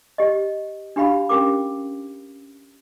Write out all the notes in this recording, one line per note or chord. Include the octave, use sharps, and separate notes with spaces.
G4 D#5
D4 F#4 G4 F5 B5
C#4 G4 A#4 D6